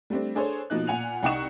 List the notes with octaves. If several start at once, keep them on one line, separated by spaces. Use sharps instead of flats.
G3 A3 C4 D4
D4 G#4 A4 C5 C#5
B2 F3 A#3 D#4 F#6
A#2 F#5 G#5 F7
C2 D#4 F#5 G5 C#6 E7